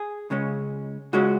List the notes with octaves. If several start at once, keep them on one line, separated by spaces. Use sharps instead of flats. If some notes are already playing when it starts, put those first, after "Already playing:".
Already playing: G#4
C#2 C#3 G#3 C#4
C#2 C#3 G#3 C#4 F#4